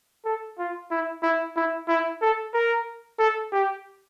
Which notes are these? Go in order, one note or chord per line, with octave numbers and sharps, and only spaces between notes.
A4
F4
E4
E4
E4
E4
A4
A#4
A4
G4